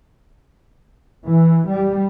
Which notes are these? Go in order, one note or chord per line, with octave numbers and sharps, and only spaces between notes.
E3
G3